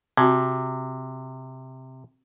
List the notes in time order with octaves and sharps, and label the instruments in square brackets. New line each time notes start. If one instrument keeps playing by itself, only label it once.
[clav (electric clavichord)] C3 [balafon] C4 F#4